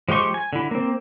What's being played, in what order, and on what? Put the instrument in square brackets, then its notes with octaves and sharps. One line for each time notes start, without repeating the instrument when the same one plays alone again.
[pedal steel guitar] F3 G#3 G4 C6 C#6
G#5
D3 E4
A#3 C4